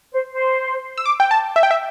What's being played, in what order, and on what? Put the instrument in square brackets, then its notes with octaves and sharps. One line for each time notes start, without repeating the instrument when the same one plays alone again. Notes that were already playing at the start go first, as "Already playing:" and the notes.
[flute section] C5
C5
[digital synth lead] E6
D6
G5
A5
E5
G5
E5